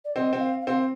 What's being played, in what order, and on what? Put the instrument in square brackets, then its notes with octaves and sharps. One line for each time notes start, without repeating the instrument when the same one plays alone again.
[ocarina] D5
[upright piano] C4 [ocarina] D#5
[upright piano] C4
[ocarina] F5
F5
[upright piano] C4